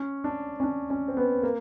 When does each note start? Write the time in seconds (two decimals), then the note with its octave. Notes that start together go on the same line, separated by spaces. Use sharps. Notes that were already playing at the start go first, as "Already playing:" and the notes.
Already playing: C#4
0.24 D4
0.60 C#4
0.64 D4
0.90 C#4
1.08 C4
1.17 B3
1.43 A#3